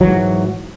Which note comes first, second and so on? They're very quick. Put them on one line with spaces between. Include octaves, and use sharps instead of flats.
F#3 E3 G#2